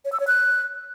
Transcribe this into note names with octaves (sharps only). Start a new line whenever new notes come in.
C#5
E6
C#5
F#6